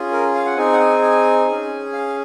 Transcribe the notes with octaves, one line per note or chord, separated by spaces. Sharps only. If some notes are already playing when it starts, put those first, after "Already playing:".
Already playing: C#4 F4 G#4
A#4
F5
F#5
C4 D#4 G#4 G#5
F#5
G#5
G#5
C#4 G#4
F5